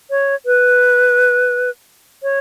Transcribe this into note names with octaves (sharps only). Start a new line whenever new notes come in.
C#5
B4
C#5